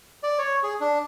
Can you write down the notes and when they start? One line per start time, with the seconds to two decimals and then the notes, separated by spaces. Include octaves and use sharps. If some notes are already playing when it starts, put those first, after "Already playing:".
0.23 D5
0.39 C#5
0.63 G#4
0.80 D4